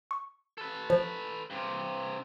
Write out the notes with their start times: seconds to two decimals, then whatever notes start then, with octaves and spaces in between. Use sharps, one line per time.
0.11 C#6
0.58 A4 B4
0.90 F3
1.50 G2 C3